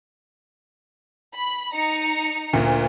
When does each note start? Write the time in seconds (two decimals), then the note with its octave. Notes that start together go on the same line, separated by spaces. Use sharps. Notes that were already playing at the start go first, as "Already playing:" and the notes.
1.34 B5
1.74 D#4 A#5 C#7
2.53 D2 A#2